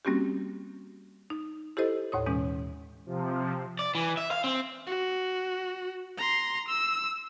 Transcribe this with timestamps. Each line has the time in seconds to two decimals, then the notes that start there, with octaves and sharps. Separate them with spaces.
0.05 G3 A#3 C4 C#4 F#4 G4
1.30 D#4
1.77 E4 G4 A4 C5 D#5
2.12 D#2 A2 C#5 D#6
2.26 B2 E3 G#3 C#4
3.06 C3 F3
3.79 D5
3.95 E3
4.17 E5
4.31 F5
4.44 C4
4.87 F#4
6.18 A#5 C6
6.68 E6